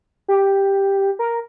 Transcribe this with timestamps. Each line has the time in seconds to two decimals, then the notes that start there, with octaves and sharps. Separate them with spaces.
0.28 G4
1.19 A#4